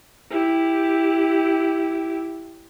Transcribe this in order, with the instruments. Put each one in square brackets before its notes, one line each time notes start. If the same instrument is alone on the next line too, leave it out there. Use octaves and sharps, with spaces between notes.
[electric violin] E4 G4